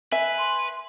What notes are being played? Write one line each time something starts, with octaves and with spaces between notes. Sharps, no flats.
B4 E5 G#5
C6